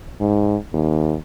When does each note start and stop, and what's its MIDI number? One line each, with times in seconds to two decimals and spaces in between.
0.20 0.56 44
0.73 1.15 39